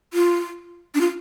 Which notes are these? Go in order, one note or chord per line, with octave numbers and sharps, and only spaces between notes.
F4
D4
F4